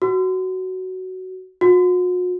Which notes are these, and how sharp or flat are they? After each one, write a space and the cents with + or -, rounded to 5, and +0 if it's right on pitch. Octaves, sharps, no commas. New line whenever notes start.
F#4 +10
F#4 -40